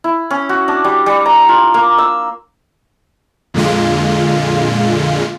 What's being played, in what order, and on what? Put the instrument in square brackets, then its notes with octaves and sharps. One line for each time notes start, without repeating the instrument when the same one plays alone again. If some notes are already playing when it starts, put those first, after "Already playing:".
[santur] E4
C#4
F#4
D4
G3
G3
A#5
F4
A#3
E6
[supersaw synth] F2 A#2 D3 G#3 F4